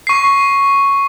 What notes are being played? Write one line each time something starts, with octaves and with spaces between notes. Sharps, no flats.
C#6 C7